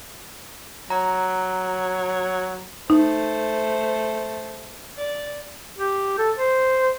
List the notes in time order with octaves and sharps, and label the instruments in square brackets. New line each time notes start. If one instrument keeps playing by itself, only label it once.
[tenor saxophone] F#3 [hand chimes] A#5
[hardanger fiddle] A3 C5 [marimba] D#4
[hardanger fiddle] D5
[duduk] G4
A4
C5